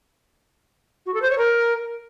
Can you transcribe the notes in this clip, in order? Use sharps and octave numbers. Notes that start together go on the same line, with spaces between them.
F#4
A4
C5
C#5
A#4